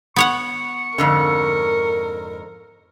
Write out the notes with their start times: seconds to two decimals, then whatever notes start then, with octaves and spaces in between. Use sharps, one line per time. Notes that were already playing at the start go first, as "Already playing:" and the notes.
0.16 B3 C#5 F#5 C#6
0.98 F2 G#2 D3 A#4